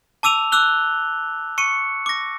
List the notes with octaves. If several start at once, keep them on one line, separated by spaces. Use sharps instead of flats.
A5 D6 E6 D#7 F7
D6 E6 F#6 G7
C#6 C#7 D#7
D6 A#6